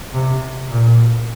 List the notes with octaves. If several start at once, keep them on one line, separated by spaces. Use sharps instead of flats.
C3
A#2